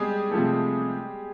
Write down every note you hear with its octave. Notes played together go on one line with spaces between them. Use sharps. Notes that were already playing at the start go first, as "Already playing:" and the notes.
Already playing: G3 G#3 G4 G#4
C3 F3 A3